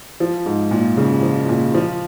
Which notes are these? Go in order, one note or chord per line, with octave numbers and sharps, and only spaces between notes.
F3
G#2
A#2
C#3
F3
A#2
F3